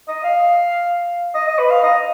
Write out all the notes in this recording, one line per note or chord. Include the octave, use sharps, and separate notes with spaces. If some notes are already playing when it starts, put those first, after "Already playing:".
D#5
F5
D#5
D#5
B4
F5
D#5